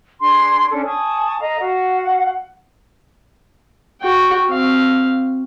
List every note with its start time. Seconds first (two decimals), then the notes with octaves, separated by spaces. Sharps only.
0.20 D4 G#4 C6
0.71 C#4 D4 A4
0.85 G#5 A5 C#6 D#6
1.40 A4 D#5 F5 A#5
1.59 F#4 F5 F#5
4.01 F#4 G5
4.50 C4 F5